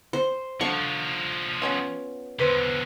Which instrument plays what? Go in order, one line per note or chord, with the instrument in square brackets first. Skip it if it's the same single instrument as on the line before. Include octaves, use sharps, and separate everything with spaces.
[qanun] C5
[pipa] D3 F5 [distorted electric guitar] F3 F#4 [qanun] C#6
[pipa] B3 C#4 F4
[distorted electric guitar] E2 D3 [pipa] B4 C5